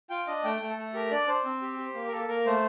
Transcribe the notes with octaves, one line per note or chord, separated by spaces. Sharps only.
F4 G5
D4 D#5
A3 G5
A3
A4
A3
G4 A#4
D4 D5
D4 C5
C4
G4
G4
A#3
A#4
A#3 A4
A#3 A#4
A3 C5